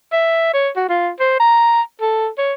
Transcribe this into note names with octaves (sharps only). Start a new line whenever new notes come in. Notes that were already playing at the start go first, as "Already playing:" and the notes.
E5
C#5
F#4
F4
C5
A#5
A4
C#5